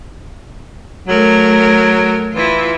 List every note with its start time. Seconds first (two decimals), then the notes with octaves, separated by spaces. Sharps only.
1.07 F#3 A3 A#4
2.33 E3 E4 F4